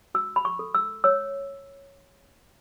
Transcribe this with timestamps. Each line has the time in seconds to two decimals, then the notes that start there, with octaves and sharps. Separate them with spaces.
0.14 F#4 E6
0.36 B5
0.45 C#6
0.59 A4
0.75 E6
1.04 C#5 E6